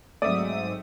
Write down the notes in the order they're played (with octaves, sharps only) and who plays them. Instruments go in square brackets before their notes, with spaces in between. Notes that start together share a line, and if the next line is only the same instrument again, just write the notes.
[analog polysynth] G#2 D#6 [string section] F#3 [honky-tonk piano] A3 C4 E5 [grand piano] D5